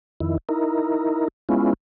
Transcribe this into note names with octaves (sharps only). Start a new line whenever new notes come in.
F2 D#3 E4
D#4 E4 A#4
G#3 B3 C#4 E4 F4